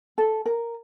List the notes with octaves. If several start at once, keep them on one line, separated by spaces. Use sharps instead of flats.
A4
A#4